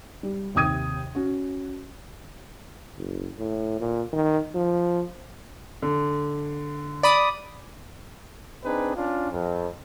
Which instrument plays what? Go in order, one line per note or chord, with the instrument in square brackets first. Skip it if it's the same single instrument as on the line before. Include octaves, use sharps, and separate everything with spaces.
[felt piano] G3
D#2 C3 G5 D#6 G#6 D#7
C#4 F#4
[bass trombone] F#1
A2
A#2
D#3
F3
[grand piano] D3
[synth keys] D5 B5 D#6
[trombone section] C4 D4 D#4 G#4 B4
C#4 D4 F4
F2